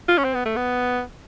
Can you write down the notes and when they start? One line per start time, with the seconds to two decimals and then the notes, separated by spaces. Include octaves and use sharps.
0.08 F4
0.18 C#4
0.24 C4
0.34 B3
0.46 A3
0.56 B3